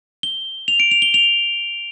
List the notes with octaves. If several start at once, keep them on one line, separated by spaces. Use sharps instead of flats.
G7
F7
D7
F7
G7
F7